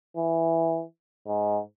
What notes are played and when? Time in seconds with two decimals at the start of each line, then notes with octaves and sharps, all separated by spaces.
0.17 E3
1.27 G#2